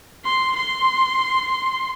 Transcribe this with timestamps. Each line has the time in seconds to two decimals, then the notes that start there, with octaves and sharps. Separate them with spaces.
0.25 C6
0.56 C6